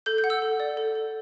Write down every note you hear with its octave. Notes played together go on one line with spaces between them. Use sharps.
A4 G6
G6
F#5
E6
A4
D5
A4
A4